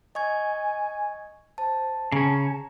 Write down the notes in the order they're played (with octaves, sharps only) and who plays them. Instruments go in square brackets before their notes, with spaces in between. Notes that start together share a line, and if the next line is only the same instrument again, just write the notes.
[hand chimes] D#5 C#6 G#6 [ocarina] G#5
[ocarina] C5 [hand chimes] A5
[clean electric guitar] C#3 C#4 [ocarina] A5 [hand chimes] A#5